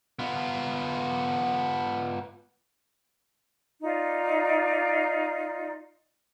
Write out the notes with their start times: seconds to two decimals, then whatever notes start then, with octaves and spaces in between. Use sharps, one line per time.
0.19 B3 F4
3.82 D#4 F4 D5